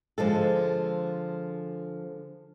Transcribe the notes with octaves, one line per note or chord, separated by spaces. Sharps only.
D3 F3 G#3 A4